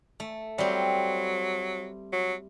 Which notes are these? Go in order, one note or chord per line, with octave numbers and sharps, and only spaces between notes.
A3
F#3 G3 C4
F#3